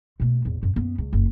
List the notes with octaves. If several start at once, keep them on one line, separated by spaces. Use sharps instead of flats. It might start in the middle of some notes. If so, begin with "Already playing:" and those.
B2 A3
A1 E2
F#2
F#2 B3
C#2
F#1